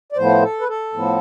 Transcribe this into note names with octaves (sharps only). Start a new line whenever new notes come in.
D5
A2 F3 B3 C5
A4
B4
A4
A2 F3 B3